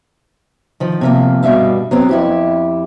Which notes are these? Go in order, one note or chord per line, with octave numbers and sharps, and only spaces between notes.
D#3 F3
C3 F3 A#3
G2 B2 G3 E5 F5
F#3 B3 C4
F2 E4 G4